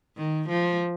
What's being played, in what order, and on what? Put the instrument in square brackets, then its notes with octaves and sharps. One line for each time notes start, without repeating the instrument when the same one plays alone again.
[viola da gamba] D#3
F3